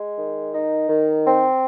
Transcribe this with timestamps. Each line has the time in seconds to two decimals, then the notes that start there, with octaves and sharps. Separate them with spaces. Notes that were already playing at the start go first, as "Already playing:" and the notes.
Already playing: G#3
0.17 D#3
0.53 D#4
0.88 D#3
1.25 C4